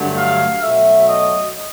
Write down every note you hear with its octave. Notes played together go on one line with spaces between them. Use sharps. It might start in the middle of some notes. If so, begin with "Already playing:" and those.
Already playing: G2 D3 F#3 A3
F5
B2 F#3 A3 E5
D#5